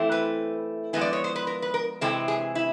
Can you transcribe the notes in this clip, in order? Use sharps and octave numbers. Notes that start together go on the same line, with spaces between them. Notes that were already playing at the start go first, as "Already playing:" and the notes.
Already playing: E3 A3 C4 E4
B4
F3 G#3 B3 E4
D5
C#5
C5
B4
A#4
B4
A#4
C3 E3 G#3 C4 E4 A4
G#4
E4